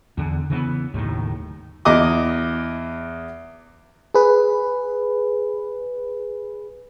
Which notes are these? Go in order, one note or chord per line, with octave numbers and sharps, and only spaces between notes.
E2 D3
C#3 E3 A3 B3
F#1 D#2 A2 D#3
E2 D#5 D6 D#6
G#4 B4